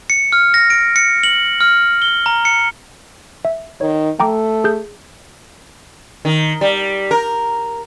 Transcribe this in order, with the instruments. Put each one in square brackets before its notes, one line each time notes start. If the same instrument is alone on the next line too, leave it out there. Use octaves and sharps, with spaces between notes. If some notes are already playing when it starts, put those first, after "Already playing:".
[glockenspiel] C#7
F6
A#6
D7
C#7
F#7
F6
G7
A#5
C#7
[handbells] E5
[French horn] D#3 [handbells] C#5
[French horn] A3 [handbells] G5 A#5 D6
[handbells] G#4 G6
[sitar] D#3
G3
A#4